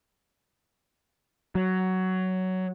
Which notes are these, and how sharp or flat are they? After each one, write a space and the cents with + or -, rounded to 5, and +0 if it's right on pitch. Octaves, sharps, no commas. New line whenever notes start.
F#3 +10